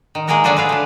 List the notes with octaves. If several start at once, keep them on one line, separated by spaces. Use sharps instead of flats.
D#3
G#3 A#3 G#4 A#4 D#5 F#5
D3 F#3 D4 F#4 G#4 A4
G#4 B4 F5
A3 D4